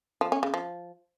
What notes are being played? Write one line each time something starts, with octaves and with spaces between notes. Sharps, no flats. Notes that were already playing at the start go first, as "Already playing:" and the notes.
F3
C#4
C#3
F3